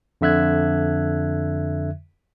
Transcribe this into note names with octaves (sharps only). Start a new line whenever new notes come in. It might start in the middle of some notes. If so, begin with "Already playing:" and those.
F2 D3 E5 F#6 G#6